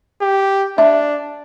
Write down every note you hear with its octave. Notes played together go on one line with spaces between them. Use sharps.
G4
D4 E5